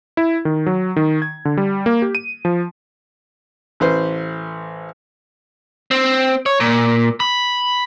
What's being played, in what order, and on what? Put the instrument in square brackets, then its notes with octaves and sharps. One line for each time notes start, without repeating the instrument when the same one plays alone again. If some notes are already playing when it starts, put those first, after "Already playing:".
[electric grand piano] E4
D#3
F#3
D#3
G#6
D3
G3
A#3
G4
D#7
F3
[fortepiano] A1 B4 C5
[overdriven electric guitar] C4
C#5
A#2
B5